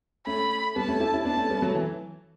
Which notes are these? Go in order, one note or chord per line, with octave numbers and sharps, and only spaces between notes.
A3 C#4 B5
G3 B3 A5
A3 C#4
E4 G4
C#4 E4
B3 D4 A5
A3 C#4
G3 B3
F#3 A3
E3